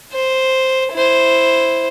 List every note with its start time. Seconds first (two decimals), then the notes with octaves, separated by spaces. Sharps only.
0.12 C5
0.94 E4 C5